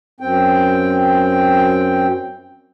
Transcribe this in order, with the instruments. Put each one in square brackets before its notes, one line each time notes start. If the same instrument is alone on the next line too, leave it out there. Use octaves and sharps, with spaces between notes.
[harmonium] F#2 C4 G5